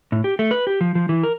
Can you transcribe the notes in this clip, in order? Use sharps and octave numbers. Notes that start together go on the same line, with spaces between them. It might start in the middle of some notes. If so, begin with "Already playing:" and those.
A2
G4
A3
B4
G4
F3
F3
E3
A#4